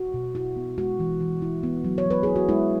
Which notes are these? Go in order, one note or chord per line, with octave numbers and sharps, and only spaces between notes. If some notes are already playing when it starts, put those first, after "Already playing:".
Already playing: F#4
B2
E4 F#4
B3
G#3 F#4
E3
E3
E4
B3
F#3
C#5
F#3 B4
E4 G#4
F#4
G#3 E4